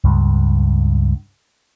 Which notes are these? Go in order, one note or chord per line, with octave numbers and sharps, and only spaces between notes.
C#2 G2